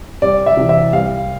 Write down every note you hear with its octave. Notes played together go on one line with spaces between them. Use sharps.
C2 D5
E5
C3 E3
E5
C2 F5